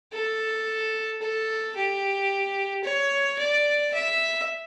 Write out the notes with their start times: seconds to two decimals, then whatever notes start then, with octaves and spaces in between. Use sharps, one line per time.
0.13 A4
1.22 A4
1.76 G4
2.84 C#5
3.39 D5
3.93 E5